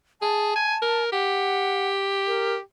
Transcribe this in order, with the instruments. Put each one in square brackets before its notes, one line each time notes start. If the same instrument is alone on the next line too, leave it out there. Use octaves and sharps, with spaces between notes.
[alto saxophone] G#4 [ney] A5
[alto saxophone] G#5
A#4
[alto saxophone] G4 [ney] F#5
[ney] A#4